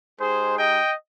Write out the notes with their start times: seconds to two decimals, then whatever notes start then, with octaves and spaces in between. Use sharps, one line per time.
0.19 G#3 D#4 G4 G#4 C5
0.58 D#5 G5